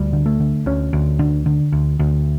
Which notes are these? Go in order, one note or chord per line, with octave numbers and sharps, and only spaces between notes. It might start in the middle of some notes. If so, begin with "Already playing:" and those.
Already playing: D2 G3
D3
A3
D3
D2 C#4
D2
D3
D3
D2
D2